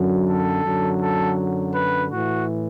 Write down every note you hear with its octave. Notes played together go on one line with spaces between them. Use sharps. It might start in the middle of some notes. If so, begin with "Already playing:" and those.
Already playing: F#2 D3 F#3
A4
F#2 D3 F#3
A4
B4
A2 E3 F#4